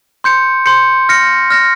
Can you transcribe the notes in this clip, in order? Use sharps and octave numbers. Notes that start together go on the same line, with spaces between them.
C6 G6 C#7
C6 G6 C#7
F6 A#6 C#7
F6 A#6 C#7